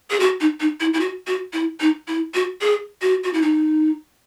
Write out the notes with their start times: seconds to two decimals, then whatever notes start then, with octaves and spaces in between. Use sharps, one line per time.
0.10 G#4
0.20 F#4
0.41 D#4
0.60 D#4
0.80 E4
0.94 E4
1.00 F#4
1.27 F#4
1.53 E4
1.80 D#4
2.08 E4
2.34 F#4
2.61 G#4
3.02 F#4
3.24 F#4
3.33 E4
3.42 D#4